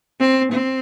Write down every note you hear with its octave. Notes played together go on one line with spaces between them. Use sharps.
C4
C4